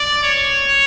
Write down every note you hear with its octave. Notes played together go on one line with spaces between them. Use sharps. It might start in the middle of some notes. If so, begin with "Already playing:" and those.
Already playing: D5
C#5